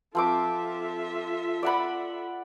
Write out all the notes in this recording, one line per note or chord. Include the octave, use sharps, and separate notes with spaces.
F3 C4 F4 A4 E5 D6
D5 F#5 B5